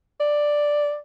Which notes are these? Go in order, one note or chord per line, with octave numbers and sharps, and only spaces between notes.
D5